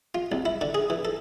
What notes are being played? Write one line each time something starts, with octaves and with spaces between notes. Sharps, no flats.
F4
C2
E4
D3
G#4
E3
A4